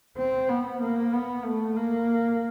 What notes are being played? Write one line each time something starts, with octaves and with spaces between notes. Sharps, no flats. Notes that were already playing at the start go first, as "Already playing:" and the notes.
C4
B3
A#3
B3
A3
A#3